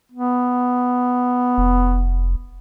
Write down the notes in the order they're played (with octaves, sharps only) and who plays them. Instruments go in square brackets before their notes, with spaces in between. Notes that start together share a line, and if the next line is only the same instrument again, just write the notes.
[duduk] B3
[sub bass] F1